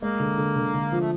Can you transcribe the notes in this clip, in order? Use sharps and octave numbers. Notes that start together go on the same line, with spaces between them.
G#3 A#3
D3
D3
D3
D3
F3
A3